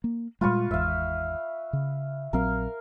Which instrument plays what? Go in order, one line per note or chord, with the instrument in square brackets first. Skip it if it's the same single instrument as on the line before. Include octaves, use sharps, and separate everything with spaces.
[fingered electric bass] A#3
[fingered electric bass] A#2 G3 G#3 [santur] F4 B4 C#6
[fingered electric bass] G#1 E2 G#2 [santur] E5 F5
[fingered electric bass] C#3
[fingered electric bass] A#1 F#3 C4 [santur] A#4 F5